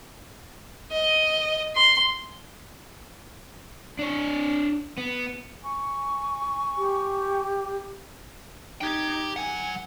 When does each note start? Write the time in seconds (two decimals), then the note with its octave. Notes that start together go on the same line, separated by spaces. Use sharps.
0.92 D#5
1.76 C6
3.99 D4 C#5
4.98 B3
5.63 G#5 C#6
6.78 G4
8.81 D#4 G4 G5 G#6
9.36 F#3 F#5 G#5